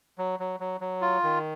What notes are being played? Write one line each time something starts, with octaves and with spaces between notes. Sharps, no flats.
F#3
F#3
F#3
F#3
F4
D#3